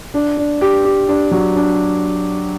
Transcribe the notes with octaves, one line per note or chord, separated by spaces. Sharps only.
D4
D4
G4
G4
D4
F#3
D4